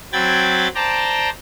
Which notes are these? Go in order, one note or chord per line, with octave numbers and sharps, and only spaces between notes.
F#3 C4 G5 B5 G#6 A6
C5 D5 G5 A5 A#5